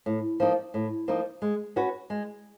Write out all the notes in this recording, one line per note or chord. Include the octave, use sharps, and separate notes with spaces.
A2
F3 A#3 D#4
A2
F3 A#3 D#4
G#3
C#4 F#4 B4
G#3